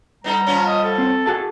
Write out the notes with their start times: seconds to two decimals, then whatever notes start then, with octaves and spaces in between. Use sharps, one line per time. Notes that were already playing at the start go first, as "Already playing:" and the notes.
0.24 G3 B3 D#4 A4 A#5
0.47 F3 B3 C#4
0.66 D#5
0.83 A4
0.98 C4
1.26 F#4 G#4 A5